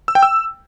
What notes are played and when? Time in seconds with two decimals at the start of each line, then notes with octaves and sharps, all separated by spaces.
0.08 E6
0.15 G5
0.23 E6